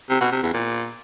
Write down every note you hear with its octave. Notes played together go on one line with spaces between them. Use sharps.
C3
B2
C3
E2
A#2